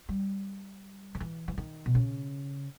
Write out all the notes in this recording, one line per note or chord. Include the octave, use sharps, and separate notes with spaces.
G3
D#3
E3
E3
D#3
B2
C#3